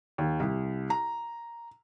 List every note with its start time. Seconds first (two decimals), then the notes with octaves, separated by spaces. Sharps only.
0.18 D#2
0.40 C2
0.90 A#5